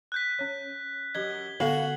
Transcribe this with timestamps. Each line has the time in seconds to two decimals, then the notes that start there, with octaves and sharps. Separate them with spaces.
0.12 F#6 G6 B6
0.39 C#4 C#5
1.15 F#2 G4 D#5 G#6 G7
1.60 D3 B3 F#4 A4 F5 F#7